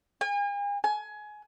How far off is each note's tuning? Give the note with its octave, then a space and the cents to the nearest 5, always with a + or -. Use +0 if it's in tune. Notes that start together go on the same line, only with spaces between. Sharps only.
G#5 -40
G#5 +20